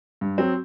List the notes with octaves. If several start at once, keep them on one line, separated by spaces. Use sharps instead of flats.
G2
F#3 C4